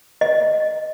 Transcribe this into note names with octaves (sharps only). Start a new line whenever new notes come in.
D#5